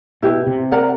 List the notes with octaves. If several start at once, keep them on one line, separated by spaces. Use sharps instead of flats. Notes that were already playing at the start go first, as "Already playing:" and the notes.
B2 E4 G4 B4
C3
A#4 D5 F#5 A#5